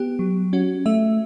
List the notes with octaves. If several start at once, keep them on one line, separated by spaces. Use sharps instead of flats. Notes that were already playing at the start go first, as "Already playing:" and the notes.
Already playing: B3 G4
F#3
C#4 F#4
A3 E5